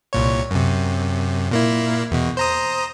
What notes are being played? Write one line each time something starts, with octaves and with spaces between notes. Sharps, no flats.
C2 A#2 C#5
F#2 C3
A#2 A#3 E4
E2 B2
C5 A#5 D#6